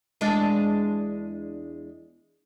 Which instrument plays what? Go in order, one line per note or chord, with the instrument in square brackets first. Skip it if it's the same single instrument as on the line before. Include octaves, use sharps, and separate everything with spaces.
[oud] E2 G#3 D4